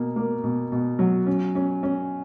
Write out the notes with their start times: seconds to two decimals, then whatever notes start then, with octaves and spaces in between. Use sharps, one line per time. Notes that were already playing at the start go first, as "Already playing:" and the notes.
Already playing: B2 A#3
0.16 A#3
0.44 B2
0.72 B2
0.99 F#3
1.26 C#4
1.55 C#4
1.83 C#4